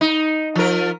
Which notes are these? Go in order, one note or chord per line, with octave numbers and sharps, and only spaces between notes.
D#4
F3 A#4